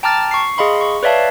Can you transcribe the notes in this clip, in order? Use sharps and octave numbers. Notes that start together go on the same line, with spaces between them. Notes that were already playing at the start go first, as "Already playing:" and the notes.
G5 A5 A#5 D6 F6 A6
C#6 C7
G#4 D#5 F5 B5 C6
C#6
B4 C#5 D5 E5 F5 A5